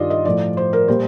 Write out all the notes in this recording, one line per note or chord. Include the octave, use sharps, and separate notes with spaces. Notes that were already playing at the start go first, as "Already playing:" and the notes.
Already playing: G2 D#3 G3 F4 D5 D#5
D#5
A2 F3 D5
C5
A#4
A#2 G3 C5